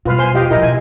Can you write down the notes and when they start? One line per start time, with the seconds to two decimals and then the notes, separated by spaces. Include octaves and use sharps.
0.05 B2 G3 F4 B4 F5
0.19 C5 G#5 C6
0.35 E2 F4 G4 D#5 F5
0.50 A#2 F3 E4 A#4 D#5
0.62 B2 G#5